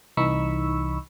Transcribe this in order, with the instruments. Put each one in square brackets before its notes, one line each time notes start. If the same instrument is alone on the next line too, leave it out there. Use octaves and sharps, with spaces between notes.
[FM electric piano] C2 E3 D#4 B5 C#6 E6